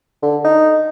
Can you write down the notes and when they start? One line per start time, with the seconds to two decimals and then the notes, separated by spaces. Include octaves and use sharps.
0.22 D3
0.45 D#4